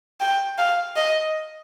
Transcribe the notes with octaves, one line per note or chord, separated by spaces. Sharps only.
G5
F5
D#5